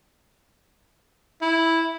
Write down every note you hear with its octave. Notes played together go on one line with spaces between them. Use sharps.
E4